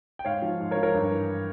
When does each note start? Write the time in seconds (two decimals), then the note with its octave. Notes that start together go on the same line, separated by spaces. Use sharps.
0.19 G5
0.25 G#2 C#5 F5
0.42 F3
0.60 G#2
0.71 A#4 C#5
0.77 F3
0.83 A#4 C#5
0.94 G2
1.12 E3